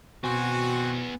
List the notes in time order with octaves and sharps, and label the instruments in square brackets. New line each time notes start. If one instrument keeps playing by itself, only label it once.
[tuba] B2 [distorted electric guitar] B3 G#5 [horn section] C4 F#4